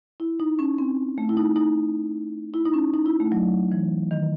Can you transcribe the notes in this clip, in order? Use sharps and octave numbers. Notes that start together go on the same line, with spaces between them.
E4
D#4
C#4
C4
A3
E4
D#4
D#4
E4
D#4
C#4
D#4
E4
A3
F#3
E3
D#3